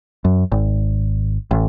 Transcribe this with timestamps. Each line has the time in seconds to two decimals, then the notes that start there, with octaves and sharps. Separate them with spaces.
0.25 F#2
0.52 G#1
1.51 A1